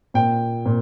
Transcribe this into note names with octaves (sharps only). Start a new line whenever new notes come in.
A#2 G5
A#2